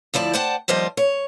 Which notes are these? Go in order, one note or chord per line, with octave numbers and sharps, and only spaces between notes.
D2 F3 E4 D5 A5
C5 D5 F#5 G5 A5
D#2 F3 G3 C5 D#5
C#5